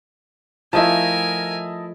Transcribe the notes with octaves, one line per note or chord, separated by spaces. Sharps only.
F3 A3 E4 A#4 D#5 G#5 A5